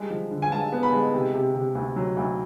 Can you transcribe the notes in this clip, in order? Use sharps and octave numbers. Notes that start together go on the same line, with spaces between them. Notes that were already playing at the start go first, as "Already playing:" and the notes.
Already playing: G3 G#3
F3
D3
G#5
G#3 A5
B3
B5
G#3
C3
C3
C3
D2
F#3
D2